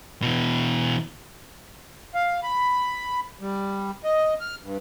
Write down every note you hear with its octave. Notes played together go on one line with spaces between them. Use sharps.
B2 E3
F5
B5
G3
D#5
F6
G2